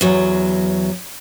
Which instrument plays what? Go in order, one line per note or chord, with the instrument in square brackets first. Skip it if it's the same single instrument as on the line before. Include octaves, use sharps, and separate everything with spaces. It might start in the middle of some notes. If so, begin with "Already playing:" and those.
[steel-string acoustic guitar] E2 F#3